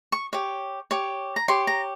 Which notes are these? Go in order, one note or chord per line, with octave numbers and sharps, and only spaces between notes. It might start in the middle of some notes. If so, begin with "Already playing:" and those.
C#6
G4 C#5
G4 C#5
A#5
G4 C#5 C6
A#5